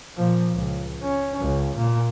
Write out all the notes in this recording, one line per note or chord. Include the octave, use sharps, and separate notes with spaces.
A#2 F3
C#2
C#4
C#2
A#2